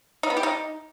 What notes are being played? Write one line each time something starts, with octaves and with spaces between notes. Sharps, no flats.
D#4
B3
G4
D#4